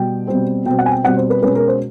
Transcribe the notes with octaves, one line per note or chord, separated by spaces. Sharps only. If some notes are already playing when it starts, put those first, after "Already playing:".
Already playing: B2 G3 G5
B2 G3 C4
B2 G3 C4 G5
F#5
G#5
G5
B2 G3 C4 F#5
C5
B4
B2 G#3 C#4 B4
A#4
C5